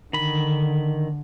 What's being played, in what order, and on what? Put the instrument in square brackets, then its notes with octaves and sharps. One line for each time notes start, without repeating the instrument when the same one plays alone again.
[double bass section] D3 [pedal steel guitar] D#3 B5